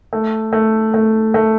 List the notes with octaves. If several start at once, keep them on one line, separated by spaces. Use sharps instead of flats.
A3
A3
A3
A3